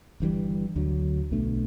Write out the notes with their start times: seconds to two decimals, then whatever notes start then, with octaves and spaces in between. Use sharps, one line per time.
0.20 G1 G2 E3 G3
0.76 D2 D3 F#3
1.31 B1 B2 A3 D4